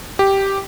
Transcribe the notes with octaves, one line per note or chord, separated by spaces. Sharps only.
G4